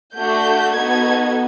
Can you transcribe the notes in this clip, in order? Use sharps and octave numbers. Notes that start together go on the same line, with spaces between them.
A3 D4 F#4 A4 G6
B3 D#4 F#4 A4 G#6